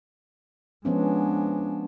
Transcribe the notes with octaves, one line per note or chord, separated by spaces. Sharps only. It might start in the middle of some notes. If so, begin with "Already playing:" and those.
F3 G#3 B3 C#4 D4